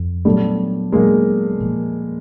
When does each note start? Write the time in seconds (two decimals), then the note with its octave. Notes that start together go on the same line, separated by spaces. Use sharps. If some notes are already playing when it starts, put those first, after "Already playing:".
Already playing: F2
0.25 A#2 F#3 G3 A3 B3 D4
0.92 A#2 F#3 G#3 A#3 B3 D4
1.61 A#2 F3 A#3